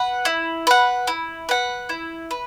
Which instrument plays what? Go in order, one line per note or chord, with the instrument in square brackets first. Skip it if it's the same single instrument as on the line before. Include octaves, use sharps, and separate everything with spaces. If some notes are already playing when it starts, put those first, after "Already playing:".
Already playing: [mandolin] B4 F#5
E4
B4 F#5
E4
B4 F#5
E4
B4